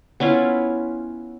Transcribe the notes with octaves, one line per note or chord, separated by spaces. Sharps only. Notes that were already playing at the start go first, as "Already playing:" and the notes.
B3 C#4 E4 F4